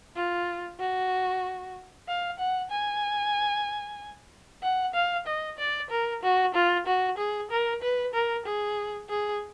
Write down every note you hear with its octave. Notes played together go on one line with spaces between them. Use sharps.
F4
F#4
F5
F#5
G#5
F#5
F5
D#5
D5
A#4
F#4
F4
F#4
G#4
A#4
B4
A#4
G#4
G#4